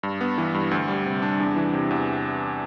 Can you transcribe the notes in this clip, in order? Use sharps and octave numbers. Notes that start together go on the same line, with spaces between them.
G2
B3
E3
G2
D2
G3
C3
D4
E2
E3
C3
E2